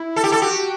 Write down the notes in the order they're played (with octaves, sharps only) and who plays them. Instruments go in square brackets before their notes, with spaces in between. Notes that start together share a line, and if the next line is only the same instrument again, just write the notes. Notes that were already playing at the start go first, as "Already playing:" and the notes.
Already playing: [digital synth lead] E4
[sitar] A4
G4
A4
[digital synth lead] F#4 [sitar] G4